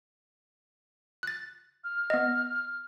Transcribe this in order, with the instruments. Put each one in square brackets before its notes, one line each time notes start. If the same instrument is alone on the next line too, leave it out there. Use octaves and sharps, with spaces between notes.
[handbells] F#6 A6
[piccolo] F6
[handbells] B3 D#5